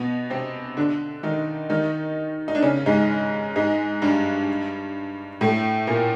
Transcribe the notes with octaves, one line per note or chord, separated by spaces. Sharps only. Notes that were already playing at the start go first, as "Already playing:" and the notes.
Already playing: B2 B3
C3 C4
D3 D4
D#3 D#4
D#3 D#4
D#4
D4
C#3 C#4
G#2 G#3
G#2 G#3
G2 G3
A2 A3
A#2 A#3